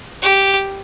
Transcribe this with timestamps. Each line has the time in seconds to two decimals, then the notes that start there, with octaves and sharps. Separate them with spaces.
0.22 G4